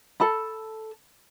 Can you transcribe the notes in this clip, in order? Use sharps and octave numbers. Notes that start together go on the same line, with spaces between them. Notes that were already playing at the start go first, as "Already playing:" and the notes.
A4 A5 B5